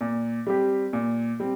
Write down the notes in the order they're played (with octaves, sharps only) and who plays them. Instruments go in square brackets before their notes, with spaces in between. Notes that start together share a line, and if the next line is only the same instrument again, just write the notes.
[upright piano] A#2
G3 C4 G4
A#2
G3 C4